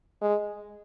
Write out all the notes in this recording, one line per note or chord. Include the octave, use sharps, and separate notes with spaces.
G#3